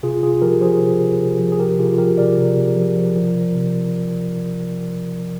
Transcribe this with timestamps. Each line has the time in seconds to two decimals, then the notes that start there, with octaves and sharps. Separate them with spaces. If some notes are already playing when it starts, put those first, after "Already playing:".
0.03 C3 F4 G#4
0.23 C3 F4 G#4
0.42 F3 G4 A#4
0.61 F3 G#4 C5
0.81 C3
1.01 C3
1.21 C3
1.40 F3
1.52 G#4
1.59 C3 G4 A#4
1.79 C3 F4 G#4
1.98 F3 G4 A#4
2.18 C3 A#4 D5
2.38 C3
2.57 C3
2.76 F3
2.96 F3
3.16 F3
3.35 C3
3.55 C3